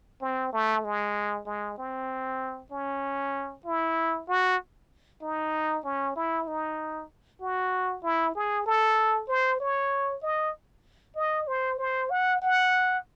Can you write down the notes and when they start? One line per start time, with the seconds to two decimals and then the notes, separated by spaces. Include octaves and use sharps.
0.22 C4
0.53 A3
0.85 G#3
1.46 G#3
1.78 C4
2.72 C#4
3.66 E4
4.28 F#4
5.22 D#4
5.84 C#4
6.16 E4
6.48 D#4
7.41 F#4
8.03 E4
8.35 G#4
8.67 A4
9.28 C5
9.60 C#5
10.22 D#5
11.16 D#5
11.48 C5
11.79 C5
12.10 F#5
12.42 F#5